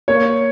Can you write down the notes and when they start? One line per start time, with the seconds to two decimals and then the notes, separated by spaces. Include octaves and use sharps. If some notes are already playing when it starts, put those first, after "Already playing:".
0.08 A#3 C#5